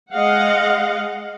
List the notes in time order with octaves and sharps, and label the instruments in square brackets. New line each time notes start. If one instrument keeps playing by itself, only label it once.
[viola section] G#3 D#5 F5 F#5